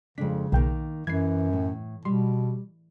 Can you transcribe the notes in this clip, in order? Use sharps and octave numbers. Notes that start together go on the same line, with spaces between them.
F2 C#3 G#3 D4 B6
B1 D#3 A#3 G5
F#2 E3 B4 G#6 C7
A2
B2 G3 C6